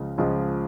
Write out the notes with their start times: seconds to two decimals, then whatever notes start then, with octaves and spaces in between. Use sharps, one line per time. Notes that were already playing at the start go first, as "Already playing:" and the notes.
Already playing: C#2 C#3 F3 G#3
0.18 C#2 C#3 F3 G#3